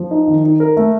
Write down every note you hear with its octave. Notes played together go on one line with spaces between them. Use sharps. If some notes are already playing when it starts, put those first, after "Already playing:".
Already playing: F3
D#4
D#3
D#4
A#4
A3